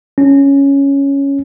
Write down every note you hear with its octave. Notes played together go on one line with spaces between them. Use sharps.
C#4